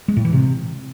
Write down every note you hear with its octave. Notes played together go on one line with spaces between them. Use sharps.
G#3
A2
E3
C3